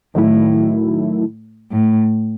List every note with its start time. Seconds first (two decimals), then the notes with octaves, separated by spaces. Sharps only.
0.15 A2 D#3 F#3 A3 E4
1.72 A2